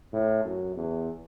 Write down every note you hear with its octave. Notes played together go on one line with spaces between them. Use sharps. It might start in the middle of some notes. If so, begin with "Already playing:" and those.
A2
F#2
E2